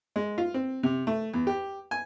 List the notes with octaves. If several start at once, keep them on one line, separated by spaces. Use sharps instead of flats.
G#3
F4
C4
C3
A3
E2
G4
G#5